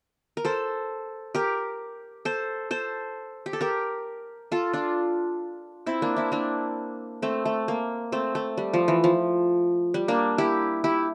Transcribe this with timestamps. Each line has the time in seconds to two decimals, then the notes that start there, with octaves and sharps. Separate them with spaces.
0.37 A#4
0.45 A4 C5
1.35 G4 A#4
2.25 A4 C5
2.71 A4 C5
3.46 G4
3.53 A4
3.61 G4 A#4
4.52 F4 A4
4.73 D4 F4
5.86 C4 E4
6.02 A#3 D4
6.16 C4 E4
6.32 A#3 D4
7.22 A3 C4
7.45 A3
7.68 A#3
8.12 A3 C4
8.35 A3
8.57 G3
8.73 F3
8.88 E3
9.04 F3
9.94 G3
10.08 A#3 D4
10.38 E4 G4
10.84 E4 G4